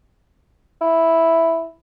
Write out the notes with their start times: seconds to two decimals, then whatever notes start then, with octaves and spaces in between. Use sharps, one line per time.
0.81 E4